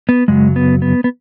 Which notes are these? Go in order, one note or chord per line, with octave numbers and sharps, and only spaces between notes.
B3
F#2 C#3 F#3 G#3
B3
B3
B3